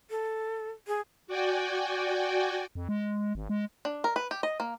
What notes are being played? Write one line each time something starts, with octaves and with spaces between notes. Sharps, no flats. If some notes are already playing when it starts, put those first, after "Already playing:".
A4
G#4
F#4 D5 G5 G#5
F2
G#3
G#1
G#3
D4
A#4
B4
G4
D#5
A#3